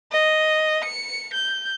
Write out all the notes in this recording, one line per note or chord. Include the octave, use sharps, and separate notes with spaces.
D#5
C#7
G6